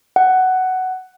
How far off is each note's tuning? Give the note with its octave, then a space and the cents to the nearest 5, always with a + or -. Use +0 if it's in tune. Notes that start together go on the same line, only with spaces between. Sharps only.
F#5 +10